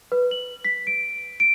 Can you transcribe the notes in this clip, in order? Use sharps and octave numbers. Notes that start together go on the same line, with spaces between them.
B4
F#7
B6
D7
D7